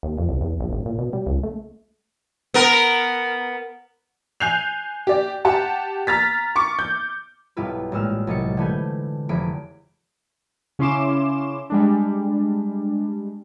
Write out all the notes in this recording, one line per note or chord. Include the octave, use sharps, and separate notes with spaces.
D#2
F2
C2
E2
A#1
G#1
A#2
B2
G3
C#2
A3
B3 A#4
G#5 F#6 G6 C7 F7
G4 D5
G4 F#5 A5
A#5 F6 A6 B6
C#6 D6 C#7
G6
B1 G2 G3 E4 F4 B4
A1 A#2 G#3 E6 F6
C2 F#3 D#5 A6 C#7
D3 E3 A3 B4 G#5 G6
F1 E3 G#4 B5 D7
C#3 C#4 E4 C6 D6 E7
G3 G#3 D4